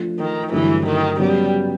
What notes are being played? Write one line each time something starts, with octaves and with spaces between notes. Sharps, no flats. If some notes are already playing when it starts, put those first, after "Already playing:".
Already playing: F3 A3 D4 F4
D#3
G2 D3 E3 F#3 A3
D#3
C#3 F#3 G3 B3